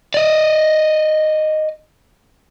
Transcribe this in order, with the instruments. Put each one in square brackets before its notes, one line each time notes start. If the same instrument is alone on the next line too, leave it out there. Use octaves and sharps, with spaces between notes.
[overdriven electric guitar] D5 D#5